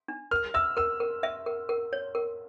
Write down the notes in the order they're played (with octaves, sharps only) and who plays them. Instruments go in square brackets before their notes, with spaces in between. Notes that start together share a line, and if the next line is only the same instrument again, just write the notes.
[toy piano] D4
[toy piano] A#4 [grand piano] F6
[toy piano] E5 [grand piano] E6
[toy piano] A#4 [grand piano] E6
[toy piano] A#4
E5
A#4
A#4
C#5
A#4